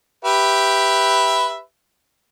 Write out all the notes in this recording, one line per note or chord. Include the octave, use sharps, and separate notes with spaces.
G4 B4 E5